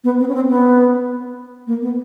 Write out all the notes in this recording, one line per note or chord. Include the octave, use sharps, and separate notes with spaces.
B3
C4
C#4
C4
B3
A#3
B3